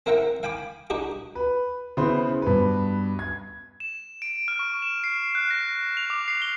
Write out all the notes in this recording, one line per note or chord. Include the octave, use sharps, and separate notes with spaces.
C4 A#4 E5 F#5 G5 A#5
F5 G5 G#5 B5 D6
D4 D#4 F#4 G4
B4
C#3 B3 E4 B4 C5
G2 B2 B4
G#6
E7
D7
F6
C#6
E7
C7
F#6
A#6
F7
D6
C7
G7